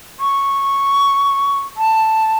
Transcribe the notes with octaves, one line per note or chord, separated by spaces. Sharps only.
C#6
A5